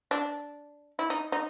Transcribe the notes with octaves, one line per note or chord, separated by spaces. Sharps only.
D4
E4
D#4
D#4